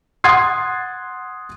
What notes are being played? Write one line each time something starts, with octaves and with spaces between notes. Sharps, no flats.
F#5 C6 D#6 G#6 A6 C7